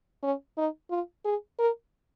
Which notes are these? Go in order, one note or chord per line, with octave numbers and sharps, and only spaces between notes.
C#4
D#4
F4
G#4
A#4